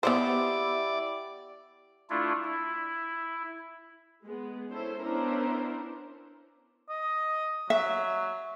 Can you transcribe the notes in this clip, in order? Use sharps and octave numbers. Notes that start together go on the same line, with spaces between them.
B3 E4 G4 C5 D5 F#5 G5
A3 D4 E4 F4
E4
G#3 B3
C#4 E4 A4 C5
B3 C#4 D4 E4 A#4 C5
D#5
F#3 E5